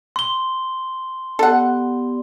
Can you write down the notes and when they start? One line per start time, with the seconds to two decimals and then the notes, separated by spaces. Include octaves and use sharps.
0.16 C6 G7
1.39 B3 G4 A4 D5 F#5